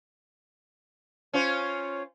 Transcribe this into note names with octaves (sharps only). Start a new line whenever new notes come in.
C#4 F4 C5